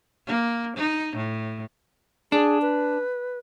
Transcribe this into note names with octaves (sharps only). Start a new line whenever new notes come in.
A#3
D#4
A2
D4 G#4
B4